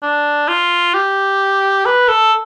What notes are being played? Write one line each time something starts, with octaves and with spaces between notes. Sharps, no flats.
D4
F4
G4
B4
A4